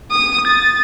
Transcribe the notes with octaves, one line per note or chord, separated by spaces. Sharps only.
D#6
A6